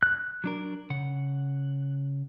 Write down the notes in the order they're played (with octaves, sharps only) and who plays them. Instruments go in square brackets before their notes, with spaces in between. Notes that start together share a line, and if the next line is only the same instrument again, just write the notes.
[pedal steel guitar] F#6
[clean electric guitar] F#3 D4 A#4
C#3 F#5